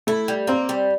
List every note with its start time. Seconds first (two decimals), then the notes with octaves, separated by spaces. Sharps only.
0.07 A3 E4
0.28 G3
0.47 A#3 C4
0.69 G3